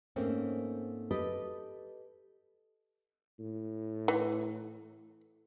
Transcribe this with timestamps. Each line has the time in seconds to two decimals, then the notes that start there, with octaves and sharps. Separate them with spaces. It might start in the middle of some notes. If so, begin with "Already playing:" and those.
0.16 G#2 A3 A#3 C4 C#4
1.11 G4 A4 B4 D#5
3.39 A2
4.08 E3